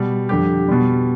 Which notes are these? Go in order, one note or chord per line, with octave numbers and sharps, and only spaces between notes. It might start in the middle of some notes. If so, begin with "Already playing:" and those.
Already playing: B2 G3
F2 D3 G3 G4
B2 G3